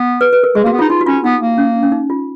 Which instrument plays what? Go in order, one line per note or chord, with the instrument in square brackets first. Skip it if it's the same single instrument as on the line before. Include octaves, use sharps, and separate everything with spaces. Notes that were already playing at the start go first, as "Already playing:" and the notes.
Already playing: [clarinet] B3
[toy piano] B4
B4
A#4
[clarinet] G#3 [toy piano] G#4
[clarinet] A#3
[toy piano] F#4
[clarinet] B3
[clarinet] D#4 [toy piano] F4
[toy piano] D#4 [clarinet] F4
[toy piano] F#4
[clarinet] C#4 [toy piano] F4
[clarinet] B3 [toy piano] D#4
[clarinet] A#3
[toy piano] C#4
C#4
D#4
F4